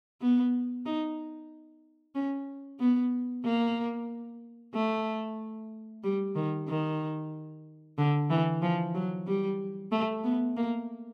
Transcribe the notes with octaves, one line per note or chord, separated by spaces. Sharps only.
B3
D#4
C#4
B3
A#3
A3
G3
D#3
D#3
D3
E3
F3
F#3
G3
A3
B3
A#3